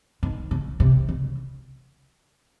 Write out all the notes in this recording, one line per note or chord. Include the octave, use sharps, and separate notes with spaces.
D#3
C#3
C3
C#3